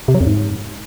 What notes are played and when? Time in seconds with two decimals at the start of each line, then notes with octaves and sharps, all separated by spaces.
0.08 C3
0.14 F#3
0.21 F2
0.27 G#2